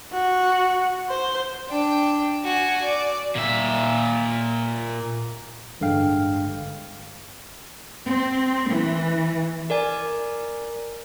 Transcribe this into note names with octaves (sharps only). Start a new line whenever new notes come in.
F#4
C5
D4 G5
F#4 G#5
D5
A#2 E5
A1 G2 D3 G#3 F5 G5
C4
E3
A#4 D5 G#5